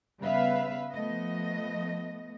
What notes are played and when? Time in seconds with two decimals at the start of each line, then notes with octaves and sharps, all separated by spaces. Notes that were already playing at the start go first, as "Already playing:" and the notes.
0.21 C#3 G3 B3 B4 E5 F5
0.94 F3 A3 B3 D#5